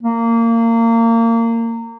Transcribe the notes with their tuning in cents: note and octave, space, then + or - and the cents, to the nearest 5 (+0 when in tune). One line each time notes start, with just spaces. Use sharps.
A#3 -25